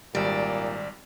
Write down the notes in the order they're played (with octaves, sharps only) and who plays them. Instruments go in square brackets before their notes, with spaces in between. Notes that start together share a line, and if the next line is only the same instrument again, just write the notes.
[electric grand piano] G#1 G3 [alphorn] A#2 [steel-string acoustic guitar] D5